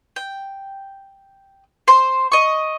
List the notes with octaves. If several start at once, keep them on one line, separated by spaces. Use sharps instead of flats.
G5
C5 C6
D#5 C#6